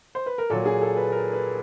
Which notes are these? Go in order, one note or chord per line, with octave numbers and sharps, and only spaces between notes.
C5
B4
A#4
A#2 F#3 A4
G#4
A4
B4
A#4
B4